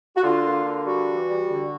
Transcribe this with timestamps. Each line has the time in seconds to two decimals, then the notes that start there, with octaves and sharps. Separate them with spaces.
0.16 F#4
0.22 D3 F4
0.43 A#3
0.64 D3
0.85 G3 F#4
1.07 E3
1.28 G3
1.48 D3